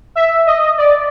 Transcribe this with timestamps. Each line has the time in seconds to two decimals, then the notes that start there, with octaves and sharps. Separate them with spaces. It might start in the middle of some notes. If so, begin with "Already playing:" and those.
0.15 E5
0.47 D#5
0.78 D5